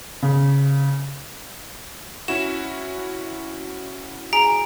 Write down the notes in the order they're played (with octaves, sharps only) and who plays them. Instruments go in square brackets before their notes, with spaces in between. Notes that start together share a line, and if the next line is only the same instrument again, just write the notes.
[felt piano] C#3
[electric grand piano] C#4 E4 F#4 [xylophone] E7
[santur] G#4 [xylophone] A#5 [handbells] D7